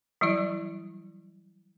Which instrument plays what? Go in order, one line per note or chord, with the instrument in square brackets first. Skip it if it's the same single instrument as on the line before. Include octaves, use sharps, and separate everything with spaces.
[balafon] E3 F#3 G3 E4 D5